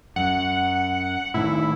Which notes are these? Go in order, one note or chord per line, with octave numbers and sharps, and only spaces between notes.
F#2 F#5
A2 D#3 E4